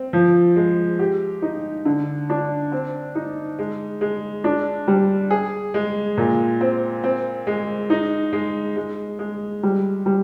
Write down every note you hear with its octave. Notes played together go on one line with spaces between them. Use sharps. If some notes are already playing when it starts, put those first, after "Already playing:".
Already playing: C4
F3
G#3
G4
D#4
D3
D4
C4
D#4
G#3
G#3
D4
G3
G#4
G#3
A#2
C4
C4
G#3
D#4
G#3
G#3
G#3
G3
G3